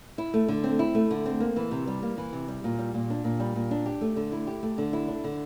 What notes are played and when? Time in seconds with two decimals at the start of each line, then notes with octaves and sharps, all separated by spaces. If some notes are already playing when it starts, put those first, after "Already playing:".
0.18 E4
0.34 A3
0.48 D3
0.64 C4
0.79 E4
0.95 A3
1.11 D3
1.26 C4
1.40 A#3
1.56 E3
1.71 C3
1.87 G3
2.03 A#3
2.18 E3
2.33 C3
2.48 G3
2.64 A#2
2.78 G3
2.94 A#2
3.10 D4
3.24 A#2
3.40 G3
3.55 A#2
3.71 D4
3.86 G4
4.01 A3
4.16 D3
4.32 E4
4.47 G4
4.63 A3
4.78 D3
4.93 E4
5.08 D4
5.24 D3